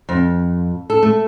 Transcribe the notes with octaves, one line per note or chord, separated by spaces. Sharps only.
F2
A4
A3